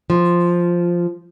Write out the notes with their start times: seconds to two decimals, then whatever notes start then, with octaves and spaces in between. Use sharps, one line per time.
0.10 F3